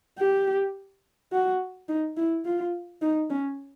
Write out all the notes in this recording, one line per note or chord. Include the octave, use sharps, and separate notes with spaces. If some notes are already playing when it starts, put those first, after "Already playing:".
G4
F#4
D#4
E4
F4
D#4
C#4